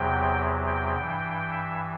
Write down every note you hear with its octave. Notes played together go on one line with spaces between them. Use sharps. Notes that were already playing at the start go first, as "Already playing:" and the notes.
Already playing: E2 C3 F#3 G5
G5
G2 E3 G5
E5